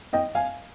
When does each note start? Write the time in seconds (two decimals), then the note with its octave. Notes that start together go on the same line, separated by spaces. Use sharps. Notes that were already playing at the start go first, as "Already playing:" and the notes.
0.13 D#5 G5
0.35 F5 G#5